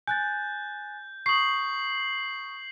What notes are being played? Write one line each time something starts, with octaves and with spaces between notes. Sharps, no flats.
G#5 F#6 G6 A6
C#6 D#6 C7 F#7